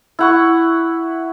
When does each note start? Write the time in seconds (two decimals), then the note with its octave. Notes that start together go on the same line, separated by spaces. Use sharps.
0.19 E4 F#5 C#6